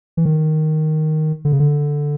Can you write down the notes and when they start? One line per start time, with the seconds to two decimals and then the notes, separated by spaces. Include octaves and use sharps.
0.17 E3
0.25 D#3
1.45 D3
1.52 C#3
1.59 D3